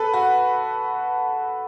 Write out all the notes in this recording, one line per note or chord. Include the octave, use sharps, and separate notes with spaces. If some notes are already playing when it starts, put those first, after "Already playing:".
Already playing: A4 B4
F#4